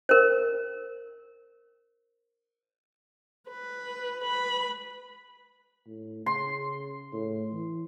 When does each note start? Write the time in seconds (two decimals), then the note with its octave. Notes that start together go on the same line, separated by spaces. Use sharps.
0.09 A#4 C5
3.49 B4
4.24 B4 B5
5.87 A2
6.26 C#3 C6
7.13 A2
7.53 E3